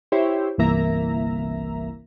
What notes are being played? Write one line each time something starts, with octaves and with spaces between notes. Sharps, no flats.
E4 G4 C5 C#5 E5
G1 C2 E3 A#3 E5 A#5